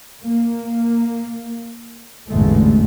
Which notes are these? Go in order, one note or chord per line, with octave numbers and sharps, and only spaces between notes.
A#3
A1 E2 G#2 D3 G#3 A3